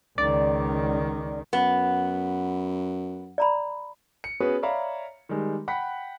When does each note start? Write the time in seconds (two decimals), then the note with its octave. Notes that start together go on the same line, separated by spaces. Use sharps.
0.18 C#2 D#3 D5
1.53 F#2 B3
3.38 D5 A#5 B5
4.24 C#7
4.40 B3 C#4 F#4 G#4 B4 C#5
4.62 C#5 D5 E5 F5 A#5 B5
5.29 D#3 G3 G#3
5.68 F#5 G5 B5 F#6 B6